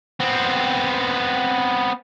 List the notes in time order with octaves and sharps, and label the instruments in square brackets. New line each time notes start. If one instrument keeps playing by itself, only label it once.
[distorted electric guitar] B3 C4